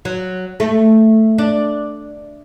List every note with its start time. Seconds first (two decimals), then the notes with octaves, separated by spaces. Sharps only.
0.05 F#3
0.60 A3
1.38 D4